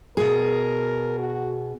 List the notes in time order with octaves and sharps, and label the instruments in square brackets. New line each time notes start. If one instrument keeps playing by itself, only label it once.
[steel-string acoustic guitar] B2 G#4 [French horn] A#4
[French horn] F#4